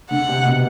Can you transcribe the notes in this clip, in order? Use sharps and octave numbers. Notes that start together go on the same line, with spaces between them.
D3 F#5
C3
B2